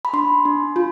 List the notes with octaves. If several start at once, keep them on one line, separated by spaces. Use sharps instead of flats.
B5
D4 C6
D4
F4